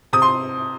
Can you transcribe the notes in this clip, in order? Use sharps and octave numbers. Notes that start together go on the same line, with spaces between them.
C3 D#6
C6